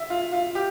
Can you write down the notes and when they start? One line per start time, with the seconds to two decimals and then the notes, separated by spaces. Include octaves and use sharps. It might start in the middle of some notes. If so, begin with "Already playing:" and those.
Already playing: E5
0.10 F4
0.32 F4
0.55 G4